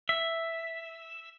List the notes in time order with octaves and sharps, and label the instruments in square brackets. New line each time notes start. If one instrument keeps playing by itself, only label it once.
[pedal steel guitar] E5